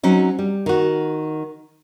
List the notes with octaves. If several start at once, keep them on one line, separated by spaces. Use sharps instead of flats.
F#3 C4 C#4 D#4
G3
D#3 F#4